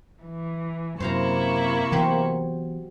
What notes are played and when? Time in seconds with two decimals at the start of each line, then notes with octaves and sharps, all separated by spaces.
0.22 E3
1.00 F#2 C3 A#3 E4 C5 F5 A#5 C#6
1.92 E3 F#3 B3 G4 C5